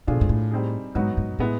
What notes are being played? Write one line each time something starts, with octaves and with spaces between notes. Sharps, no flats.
B2 F3 A3 D4 F4 G#4
G#2
A2
G3 C4 D#4 G#4
G#2 F#3 B3 D#4 F#4
G#2
A2 G#3 B3 E4